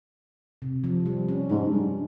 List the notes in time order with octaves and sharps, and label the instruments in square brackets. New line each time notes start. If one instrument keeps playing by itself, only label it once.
[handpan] C3
F3
G3
C#4
[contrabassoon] G#2 [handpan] D4
[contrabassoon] G2